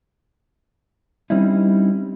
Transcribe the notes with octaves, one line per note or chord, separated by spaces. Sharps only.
G3 C4 C#4 D#4 E4